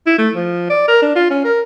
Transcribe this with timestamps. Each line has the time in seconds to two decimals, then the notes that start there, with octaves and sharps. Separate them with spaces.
0.06 E4
0.18 A3
0.35 F3
0.70 D5
0.88 A#4
1.02 D4
1.16 F4
1.30 C#4
1.44 A#4